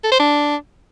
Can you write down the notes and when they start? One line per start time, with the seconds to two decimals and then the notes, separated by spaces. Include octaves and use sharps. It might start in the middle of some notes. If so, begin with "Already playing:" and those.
0.04 A4
0.12 C5
0.19 D4